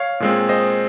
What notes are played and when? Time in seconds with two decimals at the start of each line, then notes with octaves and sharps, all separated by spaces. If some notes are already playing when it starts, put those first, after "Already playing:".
Already playing: C#5 F5
0.20 A#2 G#3 C4
0.49 C5 D#5